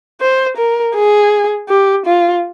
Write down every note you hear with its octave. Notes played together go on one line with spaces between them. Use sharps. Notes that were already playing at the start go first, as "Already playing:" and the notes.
C5
A#4
G#4
G4
F4